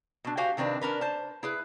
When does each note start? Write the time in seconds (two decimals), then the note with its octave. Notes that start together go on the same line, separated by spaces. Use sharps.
0.25 B2 D4
0.37 F#4 G4 C5 F5 G#5
0.57 C3 D#3 C4 D4 B4
0.81 C#4 D4 A#4 B4
1.01 C5 A5
1.43 E4 G#4 B4